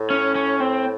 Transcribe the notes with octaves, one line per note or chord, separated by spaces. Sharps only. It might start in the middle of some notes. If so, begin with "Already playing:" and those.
Already playing: A2
C#4
C#4
C4